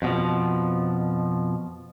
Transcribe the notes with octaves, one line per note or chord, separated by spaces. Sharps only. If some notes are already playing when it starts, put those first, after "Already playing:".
F2 B2 F3